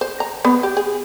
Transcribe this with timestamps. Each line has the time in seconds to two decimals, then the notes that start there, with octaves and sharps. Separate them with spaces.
0.01 C5
0.20 A#5
0.45 B3
0.63 G4
0.77 G#4